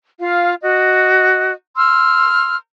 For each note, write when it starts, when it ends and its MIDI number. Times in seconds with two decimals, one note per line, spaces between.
0.20 0.54 65
0.20 0.54 77
0.62 1.52 66
0.62 1.52 75
1.77 2.55 84
1.77 2.55 88
1.77 2.55 89